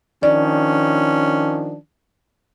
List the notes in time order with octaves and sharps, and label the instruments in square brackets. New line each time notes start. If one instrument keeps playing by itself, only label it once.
[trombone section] D#3 F3 D4 [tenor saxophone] C#4 [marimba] D5